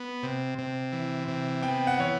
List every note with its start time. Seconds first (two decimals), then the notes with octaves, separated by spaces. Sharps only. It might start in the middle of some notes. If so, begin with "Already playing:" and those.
Already playing: B3
0.23 C3
0.58 C3
0.93 E3
1.28 C3
1.63 B3 G5
1.87 F#5
1.99 E3 C#5